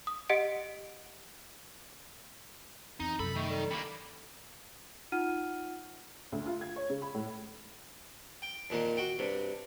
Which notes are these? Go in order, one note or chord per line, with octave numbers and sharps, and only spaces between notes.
D#6
G4 D#5 F#5 C#7 D7
E2 C4 D#4
F#2 C3 A4 B5
D#3 A3 C#6
G3 A4
G2 A#3 B5
D#4 F4 F#5 F6 D#7
D2
F4
G#6
C#5
C#3
B5
A2
G5
F2 A#2 D#3 A#3
F#4 G5
G2 C3